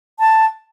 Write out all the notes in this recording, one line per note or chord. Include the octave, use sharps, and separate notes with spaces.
A5